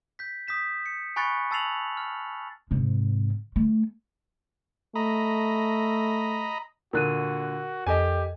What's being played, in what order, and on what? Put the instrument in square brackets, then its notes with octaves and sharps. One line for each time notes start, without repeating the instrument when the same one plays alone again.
[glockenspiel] G6 B6
D#6 G6 B6 E7
C#7
G#5 B5 C#6 F#6 A6 C#7
A5 E6 A6 C7 F7 F#7
F6
[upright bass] G#2 C3
A3
[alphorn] A3 [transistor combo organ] D#5 A#5 B5
[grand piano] A#2 D3 [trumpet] F#4 [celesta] A#4 F#6 D#7
[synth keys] F2 A4 D#5 [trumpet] G4 [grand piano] G#5